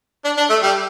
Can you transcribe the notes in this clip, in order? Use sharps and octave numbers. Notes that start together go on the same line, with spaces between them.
D4
D4
A3
G3